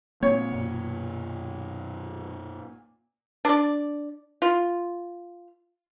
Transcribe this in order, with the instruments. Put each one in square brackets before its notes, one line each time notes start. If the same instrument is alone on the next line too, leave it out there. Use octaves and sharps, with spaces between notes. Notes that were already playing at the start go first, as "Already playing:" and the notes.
[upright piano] A#2 [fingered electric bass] A#3 C4 [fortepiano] C#5
[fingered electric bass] F#2 B2
[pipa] D4 D5
F4